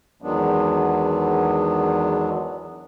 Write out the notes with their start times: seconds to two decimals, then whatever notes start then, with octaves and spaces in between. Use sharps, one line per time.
0.22 E2 D#3 F#3 G#3 B3 D4